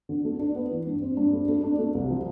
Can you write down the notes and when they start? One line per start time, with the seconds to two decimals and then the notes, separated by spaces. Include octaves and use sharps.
0.09 D3
0.25 A3
0.39 D4
0.55 B3
0.71 E3
0.87 G2
1.01 C4
1.17 G2
1.33 A3
1.48 A3
1.64 D4
1.79 A3
1.95 C2
2.10 F3